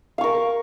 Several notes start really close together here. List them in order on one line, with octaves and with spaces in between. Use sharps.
F5 C#6 A#4